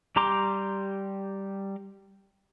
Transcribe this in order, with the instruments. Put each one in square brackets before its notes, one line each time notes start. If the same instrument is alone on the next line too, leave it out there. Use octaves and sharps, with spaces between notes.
[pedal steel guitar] G3 G4 A#5 C6 D6